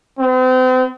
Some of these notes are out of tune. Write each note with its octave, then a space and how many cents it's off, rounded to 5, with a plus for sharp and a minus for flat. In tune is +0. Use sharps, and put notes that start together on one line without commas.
C4 -40